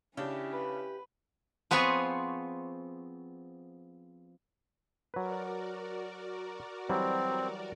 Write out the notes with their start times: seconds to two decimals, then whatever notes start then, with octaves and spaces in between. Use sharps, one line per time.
0.17 C#3 C#4 D4 E4 G4
0.52 B4
1.71 F3 B3 C4 G#4 C#5
5.14 F#3 F#4 A#4 B4 D5
6.89 E3 F#3 G3 C4